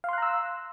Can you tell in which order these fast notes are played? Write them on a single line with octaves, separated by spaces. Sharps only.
F5 C6 F#6 A#5 E6